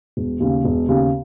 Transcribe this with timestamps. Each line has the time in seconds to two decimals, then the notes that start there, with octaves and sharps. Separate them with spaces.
0.17 E1
0.40 D#2 C#3
0.65 E1
0.89 D#2 C#3